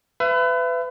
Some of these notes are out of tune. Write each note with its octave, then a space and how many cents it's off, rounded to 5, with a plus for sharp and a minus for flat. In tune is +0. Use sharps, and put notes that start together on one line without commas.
B4 +30 E5 +35